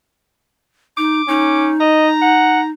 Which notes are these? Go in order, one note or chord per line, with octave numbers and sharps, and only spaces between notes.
D#4 D6
C#4 D#4
D#5 A#5
F#5